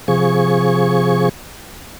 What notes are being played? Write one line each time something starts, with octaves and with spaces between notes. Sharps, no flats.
C3 F3 G#4 C#6